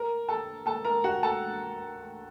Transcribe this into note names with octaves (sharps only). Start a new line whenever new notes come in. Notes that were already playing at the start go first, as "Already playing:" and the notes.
Already playing: A#4 A#5
A4 A5
A4 A5
A#4 A#5
F#4 F#5
A4 A5